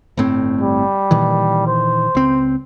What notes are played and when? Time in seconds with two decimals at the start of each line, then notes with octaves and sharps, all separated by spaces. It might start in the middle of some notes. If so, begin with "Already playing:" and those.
0.17 G1 A2 C4
0.61 G3
1.11 A#2 D#3 E3
1.67 C5
2.15 C#2 C4